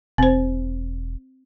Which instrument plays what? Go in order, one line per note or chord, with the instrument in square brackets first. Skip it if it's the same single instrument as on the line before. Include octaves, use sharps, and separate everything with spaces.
[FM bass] E1 [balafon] C4 C5